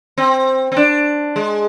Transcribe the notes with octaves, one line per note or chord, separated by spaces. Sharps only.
C4
C4
D4
G#3